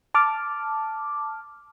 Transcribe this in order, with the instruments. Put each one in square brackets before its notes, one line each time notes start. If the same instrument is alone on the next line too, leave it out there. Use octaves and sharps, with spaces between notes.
[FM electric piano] A5 D6 F6